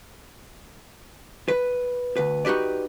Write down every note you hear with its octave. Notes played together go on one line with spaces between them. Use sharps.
B4
D2 B4
D#4 F#4 G4 B4 D5